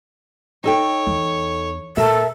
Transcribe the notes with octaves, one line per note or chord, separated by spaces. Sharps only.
D#4 A4 C#5 G5
E2
A#2 A4 A#4 E5